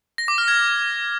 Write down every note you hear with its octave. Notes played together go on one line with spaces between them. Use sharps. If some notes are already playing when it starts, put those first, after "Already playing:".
A#6
D6
F6
G#6